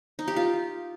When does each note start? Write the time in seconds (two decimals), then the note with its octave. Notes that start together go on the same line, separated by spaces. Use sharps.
0.19 D#4
0.28 G4
0.36 F4